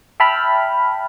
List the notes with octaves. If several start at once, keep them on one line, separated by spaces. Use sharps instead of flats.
E5 G5 A5 B5 F6